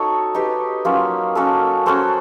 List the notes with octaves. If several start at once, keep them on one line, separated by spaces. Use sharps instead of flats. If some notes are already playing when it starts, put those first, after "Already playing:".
Already playing: D#4 F#4 A4 C#5
D#4 G4 B4
F#3 A#3 C#4 F4
A#3 C#4 F#4 A4
C#4 F#4 A4 C5